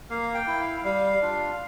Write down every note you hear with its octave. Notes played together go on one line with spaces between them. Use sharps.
A#3 F5
G5
E4
F5
G3 F5
D4 F4